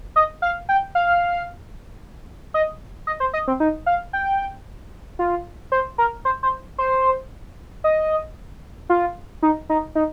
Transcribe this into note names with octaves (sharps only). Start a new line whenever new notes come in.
D#5
F5
G5
F5
D#5
D#5
C5
D#5
C4
D#4
F5
G5
F4
C5
A#4
C5
C5
C5
D#5
F4
D#4
D#4
D#4